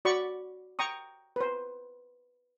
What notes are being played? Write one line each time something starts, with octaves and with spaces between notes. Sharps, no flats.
F#4 D5 B5 C#6
G5 A#5 C#6 D#6
B4 C5